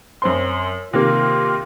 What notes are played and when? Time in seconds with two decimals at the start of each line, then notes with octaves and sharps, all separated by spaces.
0.22 F#2 C4 C6
0.93 C3 D#3 A#3 F4